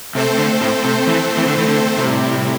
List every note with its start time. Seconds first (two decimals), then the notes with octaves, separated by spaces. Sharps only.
0.15 C3 A3 C4 A4 C5
0.38 D3
0.61 A2
0.85 C3
1.07 E3
1.37 E3
1.48 D3
1.58 E3
1.68 D3
1.98 A2 C3 G3 E4